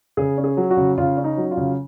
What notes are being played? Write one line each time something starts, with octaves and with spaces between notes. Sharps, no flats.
C#3 G#4
C#4
G#4
F#3
F#4
C#3
C#3 F4
C#4
D#4
F#3
F4
C#3